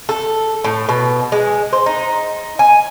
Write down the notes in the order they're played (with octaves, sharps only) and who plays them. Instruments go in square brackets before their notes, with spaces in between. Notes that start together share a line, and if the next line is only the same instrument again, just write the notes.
[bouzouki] A4
A2
B2
G#3
C5
D#4
G#5